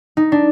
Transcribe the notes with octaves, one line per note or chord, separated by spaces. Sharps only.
D#4
D4